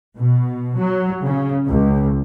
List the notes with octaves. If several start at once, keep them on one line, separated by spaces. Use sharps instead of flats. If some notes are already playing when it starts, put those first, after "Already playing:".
B2
F#3
C#3
C#2